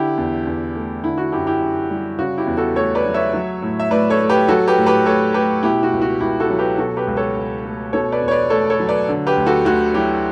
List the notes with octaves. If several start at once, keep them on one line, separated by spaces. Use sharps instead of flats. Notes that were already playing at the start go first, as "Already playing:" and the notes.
Already playing: D3 E4 G4
E2
E2
A3
D3 E4
F#4
F#2 E4 G4
E4 G4
F#2
G3
C#3 F#4
E4 G4
E2
F#4 A4
A3 A4 C#5
B4 D5
F#3
C#5 E5
F#3
A2
E5
A2 B4 D5
A4 C#5
A3
G4 B4
F#3 F#4 A4
G4 B4
A2
G4 B4
A2 A4 C#5
A3 G4 B4
B2 E4 G4
F#4
C#2
F#4
C#2 E4 G4
F#4 A4
F#3
G4 B4
B2 F#4 A4
G4 B4
C#2
A4 C#5
C#2
A3
B2 A4 C#5
B4 D5
E2
C#5
B4 D5
A3 A4 C#5
A4 C#5
F#3
B4 D5
D3
G4 B4
D2
F#4 A4
D2 F#4
F#3 E4 G4